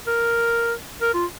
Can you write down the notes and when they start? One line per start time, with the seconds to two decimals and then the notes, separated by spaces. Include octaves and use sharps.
0.07 A#4
1.02 A#4
1.14 F4